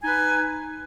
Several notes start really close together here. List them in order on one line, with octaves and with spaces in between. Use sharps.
G#5 D#4 B4